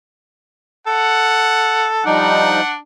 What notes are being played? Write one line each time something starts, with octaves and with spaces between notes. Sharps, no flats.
A4 F#5
F3 G3 D4 D#4 F#5